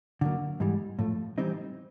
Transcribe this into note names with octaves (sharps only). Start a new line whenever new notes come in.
D3 F#3 A#3
G#2 E3 G3
A2 F3 A3
E3 G3 C4 D#4